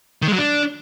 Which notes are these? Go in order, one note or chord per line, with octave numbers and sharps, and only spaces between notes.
D#3
G#3
F#3
D4